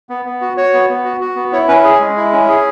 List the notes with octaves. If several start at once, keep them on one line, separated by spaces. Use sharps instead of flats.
B3
B3
F#4
F#4 C#5
B3
B3
F#4
F#4
B3
E4 C#5
C#4 B4
G#4
G#3
E4
C#4
G#4